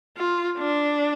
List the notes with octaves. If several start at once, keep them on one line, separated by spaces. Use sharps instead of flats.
F4
D4